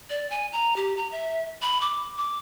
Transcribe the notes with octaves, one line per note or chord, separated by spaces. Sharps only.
D5
G#5
A#5
G4
A#5
E5
B5
D6
D6